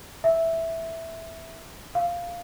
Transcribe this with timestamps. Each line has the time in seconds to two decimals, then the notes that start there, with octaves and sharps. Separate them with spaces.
0.24 E5
1.95 F5